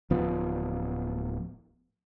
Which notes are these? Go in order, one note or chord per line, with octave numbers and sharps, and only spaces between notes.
D1 F3 B3